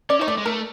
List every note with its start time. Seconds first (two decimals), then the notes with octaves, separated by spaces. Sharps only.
0.10 C#4 D5
0.19 D#4 C#5
0.27 A3 D5
0.37 G#3
0.45 A3 A#4